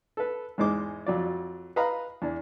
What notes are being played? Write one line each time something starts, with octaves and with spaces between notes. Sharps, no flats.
A4 B4
E2 G#2 G#3 C5 D6
F2 F#3 D5
B4 D#5 F5 A#5 B5
E2 D4